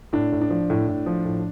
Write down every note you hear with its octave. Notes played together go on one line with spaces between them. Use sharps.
A2 D4
A2
D4
F3
A2
A2
F3
A2